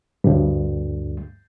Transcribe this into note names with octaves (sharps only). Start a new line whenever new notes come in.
D2 G2